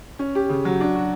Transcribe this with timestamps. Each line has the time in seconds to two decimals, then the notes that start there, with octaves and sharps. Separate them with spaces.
0.19 C#4
0.35 G4
0.49 C#3
0.65 F#3
0.80 D4
0.95 F#4